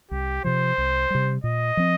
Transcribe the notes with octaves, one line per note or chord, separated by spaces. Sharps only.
C2 G4
C3 F3 C5
C2
C3 G3
A#2 D#5
F3 C4